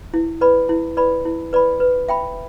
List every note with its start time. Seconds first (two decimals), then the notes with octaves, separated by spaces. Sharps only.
0.14 E4
0.41 B4 D5 B5
0.69 E4
0.97 B4 D5 B5
1.25 E4
1.53 B4 D5 B5
1.80 B4
2.08 E5 G5 B5